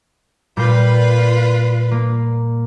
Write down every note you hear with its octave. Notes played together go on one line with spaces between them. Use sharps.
A#2 G3 F4 B4 G6
A#3